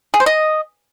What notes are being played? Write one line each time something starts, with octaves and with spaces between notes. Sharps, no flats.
G#4
C5
D#5